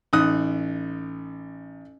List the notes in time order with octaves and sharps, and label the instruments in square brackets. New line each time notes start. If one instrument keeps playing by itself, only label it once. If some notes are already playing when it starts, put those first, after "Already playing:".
[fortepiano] A1 D#4 D#6 F#6